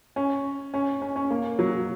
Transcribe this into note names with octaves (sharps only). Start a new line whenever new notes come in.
C#4
C#4
C#4
C#4
A#3
F#3